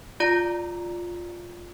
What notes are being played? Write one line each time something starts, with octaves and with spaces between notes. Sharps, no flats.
F4 D5 A#5